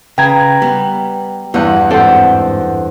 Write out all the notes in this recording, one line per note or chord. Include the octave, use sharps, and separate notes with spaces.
C#3 B4 G5 A#5 G#6
G3 B3
E2 G2 E3 F#5
G#2 C4 G4 A4 C5 F#5